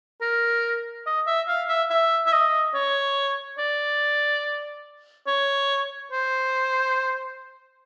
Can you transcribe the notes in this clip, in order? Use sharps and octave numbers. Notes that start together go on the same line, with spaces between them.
A#4
D#5
E5
F5
E5
E5
E5
D#5
C#5
D5
C#5
C5